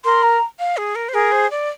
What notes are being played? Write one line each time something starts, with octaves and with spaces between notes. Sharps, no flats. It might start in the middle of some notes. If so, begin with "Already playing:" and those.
A#4 C6
A#5
F5
G#4
A#4
C5
G#4 A#4
C5
D5